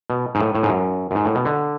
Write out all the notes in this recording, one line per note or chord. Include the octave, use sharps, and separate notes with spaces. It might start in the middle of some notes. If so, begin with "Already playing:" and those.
B2
G#2
A2
A2
G#2
F#2
F#2
G#2
A2
B2
D3